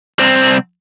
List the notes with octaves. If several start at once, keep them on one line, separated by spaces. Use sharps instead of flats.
C2 C4